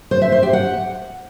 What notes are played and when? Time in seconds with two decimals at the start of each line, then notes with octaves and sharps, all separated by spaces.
0.11 C5
0.22 E5
0.32 C5
0.43 G4
0.53 F#5